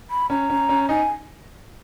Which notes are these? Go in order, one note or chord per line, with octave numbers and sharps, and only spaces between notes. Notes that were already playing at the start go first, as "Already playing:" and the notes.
B5
C#4 A#5
C#4
C#4
D#4 G#5